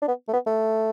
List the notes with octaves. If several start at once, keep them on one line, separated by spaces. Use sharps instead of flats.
D4
B3
A3
B3
A3